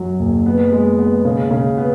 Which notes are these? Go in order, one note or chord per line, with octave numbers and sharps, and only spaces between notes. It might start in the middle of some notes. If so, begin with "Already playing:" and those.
Already playing: F#2 F#3
F#1
B3
G#3
B3
C#3
C#3
B3